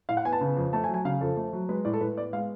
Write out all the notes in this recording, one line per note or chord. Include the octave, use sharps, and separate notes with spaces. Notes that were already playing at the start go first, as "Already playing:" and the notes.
A2 F5
F#5
B3 G#5
A5
C#3
F2
A3 A5
G#5
F#3
G#5
C#3 F5
F2 A4
A3
F#3
G#3 B4
A2 D5
A4
A2 B4
B3 D5
G#3 F5